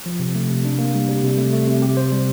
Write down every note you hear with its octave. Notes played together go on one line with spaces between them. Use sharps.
F3
C3
A3
C3
D4
A#3
G3
G3
C3
A3
A3
C3
G4
C5
G3